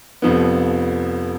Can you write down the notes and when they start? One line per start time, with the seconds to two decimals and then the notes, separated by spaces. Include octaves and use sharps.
0.22 F1 F2 F3 B3